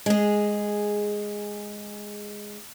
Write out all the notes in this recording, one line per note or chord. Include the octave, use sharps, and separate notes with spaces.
G#3 G#4